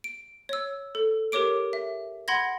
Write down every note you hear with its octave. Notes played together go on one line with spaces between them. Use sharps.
D7
C#5 E6
A4
G4 A#4 C#5 D6 D7
E5
F#5 B5 C6 G#6 A#6